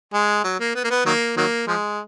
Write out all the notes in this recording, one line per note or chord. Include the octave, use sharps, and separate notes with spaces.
G#3
F#3
A#3
B3
A#3
B3
D#3 F#3 A#3
D#3 F#3 A#3
F3 G#3